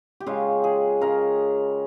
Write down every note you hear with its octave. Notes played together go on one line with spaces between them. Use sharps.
G4
C#3 G#3 F4
G#4
C#3 G#3 A#4